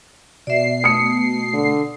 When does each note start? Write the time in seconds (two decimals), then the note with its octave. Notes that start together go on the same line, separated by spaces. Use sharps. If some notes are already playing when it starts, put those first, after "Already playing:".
0.47 B2 D5 E5 C7
0.84 A3 D#6 C#7
1.54 D3